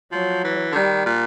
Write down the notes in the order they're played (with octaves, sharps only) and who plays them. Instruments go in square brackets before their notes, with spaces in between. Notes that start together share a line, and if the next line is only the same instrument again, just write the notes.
[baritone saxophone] F3 [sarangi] F#3
[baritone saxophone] E3
D3
[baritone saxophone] D#3 [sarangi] G3
[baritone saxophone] A#2